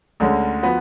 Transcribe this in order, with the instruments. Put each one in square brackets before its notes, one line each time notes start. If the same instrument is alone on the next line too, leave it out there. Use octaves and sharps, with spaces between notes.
[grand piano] D2 D3 G#3 C#4
F3 B3 F#4 B4